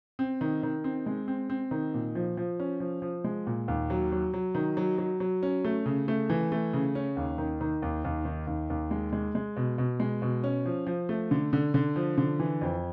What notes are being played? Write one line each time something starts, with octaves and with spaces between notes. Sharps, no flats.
C4
D#3
D#3
C4
G#3
C4
C4
D#3
A#2
F3
F3
C#4
F3
F3
G#3
A#2
D#2
F#3
F#3
F#3
D#3
F#3
F#3
F#3
C#4
A3
C#3
A3
E3
A3
C#3
C#4
D#2
D#3
D#3
D#2
D#2
D#3
D#2
D#2
G#3
G#3
G#3
B2
B2
G#3
B2
C#4
F3
F3
A3
D3
D3
D3
F3
D3
E3
F2